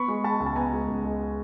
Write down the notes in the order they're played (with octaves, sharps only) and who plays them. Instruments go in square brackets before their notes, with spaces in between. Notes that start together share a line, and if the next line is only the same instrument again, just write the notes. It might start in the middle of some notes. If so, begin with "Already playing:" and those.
Already playing: [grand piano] B3 B5 C#6
G#3
G#3 A5 B5
C#2
A5
B3 G#5 A#5
G#3
C#2
G#3